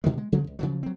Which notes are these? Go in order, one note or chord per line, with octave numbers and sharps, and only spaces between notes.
B2 D3 D#3 G#3
G#3
C#3 F3 F#3 C4
C#2
C#3 F3 F#3
F#3 C4